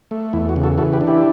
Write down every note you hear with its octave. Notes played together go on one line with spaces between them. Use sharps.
A3
E2 E4
F#4
C#3
F#4 A4
E3 F#4 A4
G4 B4
D4
E4 G4